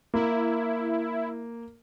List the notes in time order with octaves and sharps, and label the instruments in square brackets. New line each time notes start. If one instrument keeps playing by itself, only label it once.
[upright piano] A#3 [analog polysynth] E4